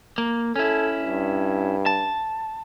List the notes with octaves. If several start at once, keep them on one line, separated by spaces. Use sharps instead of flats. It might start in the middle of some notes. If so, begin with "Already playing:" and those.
A#3
C#4 E4 A4
G2
A5